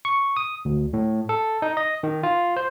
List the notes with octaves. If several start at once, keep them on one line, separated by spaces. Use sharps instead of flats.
C#6
D#6
D2
A2
A4
D#4
D#5
D#3
F4
C5